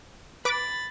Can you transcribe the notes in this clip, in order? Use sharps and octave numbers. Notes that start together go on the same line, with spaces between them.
B4 B5 D6 A6